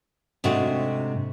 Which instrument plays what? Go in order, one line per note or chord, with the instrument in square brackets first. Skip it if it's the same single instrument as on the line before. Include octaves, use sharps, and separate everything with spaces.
[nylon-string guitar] G#2 C3 A3 D4 F#4